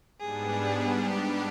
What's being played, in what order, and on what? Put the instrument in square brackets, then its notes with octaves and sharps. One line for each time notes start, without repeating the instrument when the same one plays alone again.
[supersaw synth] G#2 G3 B3 D4 [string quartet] G#4
[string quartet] G4